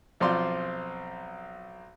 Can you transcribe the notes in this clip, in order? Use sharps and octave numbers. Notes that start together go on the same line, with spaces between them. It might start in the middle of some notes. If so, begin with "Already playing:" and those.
B1 F3 C4 D5 F5 C6